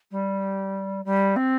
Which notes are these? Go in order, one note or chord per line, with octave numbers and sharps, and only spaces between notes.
G3
G3
C4